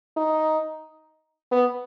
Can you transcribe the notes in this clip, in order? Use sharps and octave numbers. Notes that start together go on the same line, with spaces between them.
D#4
B3